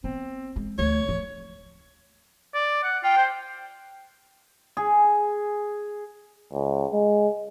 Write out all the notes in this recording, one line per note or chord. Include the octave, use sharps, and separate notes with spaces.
B3 C4
G#3
D2 A3 C#5
F3 A3
D5
F#5
F4 G5
C5
G#4
C#2
G#3